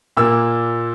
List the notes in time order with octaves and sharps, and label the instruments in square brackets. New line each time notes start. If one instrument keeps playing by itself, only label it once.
[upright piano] A#2 A#3 E6